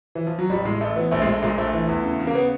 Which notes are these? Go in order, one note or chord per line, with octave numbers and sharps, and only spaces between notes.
E3
F3
F#3
A1 G3
A2 G#3
A1 A3
E3 B3
A#1 A3
G#3
A#1
A3
A#2 G#3
A#1 A3
E3
E2
C#3
C#3
A#3
B3